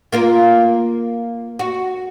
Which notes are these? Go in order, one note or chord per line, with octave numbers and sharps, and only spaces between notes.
A#3 F4 A#4
F#4